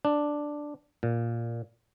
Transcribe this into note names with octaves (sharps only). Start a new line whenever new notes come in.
D4
A#2